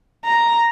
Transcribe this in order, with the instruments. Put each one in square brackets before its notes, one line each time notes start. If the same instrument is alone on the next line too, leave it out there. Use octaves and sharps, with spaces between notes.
[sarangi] A#5